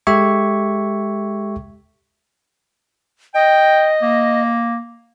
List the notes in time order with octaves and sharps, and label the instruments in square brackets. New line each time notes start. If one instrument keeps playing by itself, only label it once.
[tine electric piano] G#3 G4 A4 E5 C#6 G#6
[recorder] D#5 [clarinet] G5
[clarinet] A#3